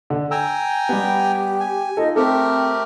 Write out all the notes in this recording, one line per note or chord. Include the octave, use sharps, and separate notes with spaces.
D3
G5 G#5 A#5 E6
G3 B3 G4
G#5
D#4 F4 A4 D#5
A3 C4 G4 A4 A#4